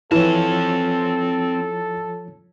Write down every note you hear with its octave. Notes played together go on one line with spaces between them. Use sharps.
E3 F3 C4 F4 A4 C#5 A5